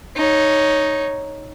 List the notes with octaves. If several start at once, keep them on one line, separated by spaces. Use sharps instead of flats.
D#4 C#5